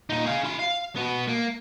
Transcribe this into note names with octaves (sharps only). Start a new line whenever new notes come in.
A#2 D#4
G#4 F5
E4 C6
F5
B2 B3
A#3